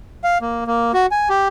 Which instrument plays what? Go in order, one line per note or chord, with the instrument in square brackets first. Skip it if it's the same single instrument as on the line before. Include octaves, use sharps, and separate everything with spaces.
[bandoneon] F5
A#3
A#3
F#4
G#5
G4